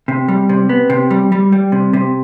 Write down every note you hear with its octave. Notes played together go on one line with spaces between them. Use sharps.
C3
G3
C3
B3
C3
G3
G3
G3
C3
C3